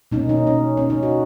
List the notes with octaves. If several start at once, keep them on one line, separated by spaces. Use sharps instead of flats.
B2 A#3 C#4 D#4
D#4
C#4
C#4
D#4
F#4